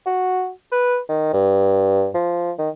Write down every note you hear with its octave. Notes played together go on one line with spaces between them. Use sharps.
F#4
B4
D#3
G2
F3
D#3